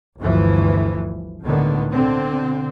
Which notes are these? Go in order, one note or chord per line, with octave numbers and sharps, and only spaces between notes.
G1 D2 G2 E3 F3
C#2 A2 D3 D#3 B3
B2 D3 C4